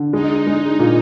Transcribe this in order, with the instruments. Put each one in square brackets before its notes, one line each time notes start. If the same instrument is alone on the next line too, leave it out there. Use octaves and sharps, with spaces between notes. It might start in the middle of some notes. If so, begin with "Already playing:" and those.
Already playing: [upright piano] D3
[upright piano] G#3 [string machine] D#4
[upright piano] G#3
A#2